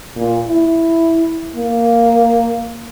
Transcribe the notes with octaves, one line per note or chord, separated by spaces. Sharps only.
A#2
E4
A#3